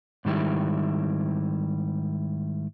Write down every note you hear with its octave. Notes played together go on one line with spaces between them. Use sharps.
G#2 D#3 G3 E4